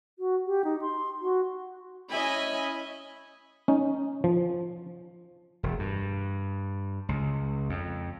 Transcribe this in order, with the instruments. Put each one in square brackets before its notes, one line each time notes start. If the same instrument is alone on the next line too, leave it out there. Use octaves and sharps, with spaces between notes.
[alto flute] F#4
G4
D#4
C6
F#4
[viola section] C#4 E4 D#5 E5 G#5 B5
[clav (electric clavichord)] C#4 D#4
F3
[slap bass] E1
G2
C#2
F2